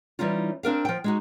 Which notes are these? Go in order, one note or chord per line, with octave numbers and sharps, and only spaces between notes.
E3 G3 C#4 D#4 F4
C4 D4 A#4 F5
F3 G5
G#3 D#4 F#4